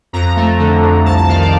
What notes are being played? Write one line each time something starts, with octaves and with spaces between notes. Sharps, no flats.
F2 A#5
A3
D3
F2
C2 A5
A5
D#3 F5
D5